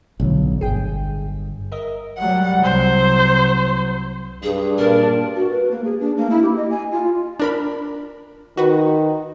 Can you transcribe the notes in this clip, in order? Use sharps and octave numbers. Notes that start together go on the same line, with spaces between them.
B1 A2 D3
G1 G#4 G5
A#4 D#5 E5
F#3 G3 F#5
C2 F#3 C5
G2 G#4
A#2 D4 A#4
F#4
B4
A#3
G#4
D4
A#3
E4
G4
D#5
G#5
F4
D4 A#4 B5
D#3 F#4 B4